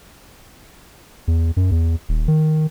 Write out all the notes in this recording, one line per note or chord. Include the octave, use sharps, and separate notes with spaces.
E2
F#2
E2
D#1
D#3